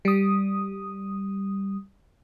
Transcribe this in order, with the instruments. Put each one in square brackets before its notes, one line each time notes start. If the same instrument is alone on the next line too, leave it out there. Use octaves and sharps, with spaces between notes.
[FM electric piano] G3 D#6